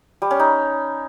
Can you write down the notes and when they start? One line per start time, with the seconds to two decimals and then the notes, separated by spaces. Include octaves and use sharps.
0.22 G3
0.31 C#4
0.40 D#4